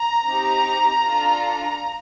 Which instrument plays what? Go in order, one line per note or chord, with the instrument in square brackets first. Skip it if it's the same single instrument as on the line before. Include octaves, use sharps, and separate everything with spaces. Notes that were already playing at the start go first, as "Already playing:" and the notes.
Already playing: [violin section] A#5
C4 D#4 G4
D4 F4 A4